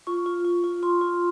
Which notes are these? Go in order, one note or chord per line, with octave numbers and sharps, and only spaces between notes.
F4 C#6
F4
F4
F4
F4 C6
F4